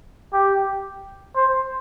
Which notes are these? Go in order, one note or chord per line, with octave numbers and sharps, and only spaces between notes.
G4
C5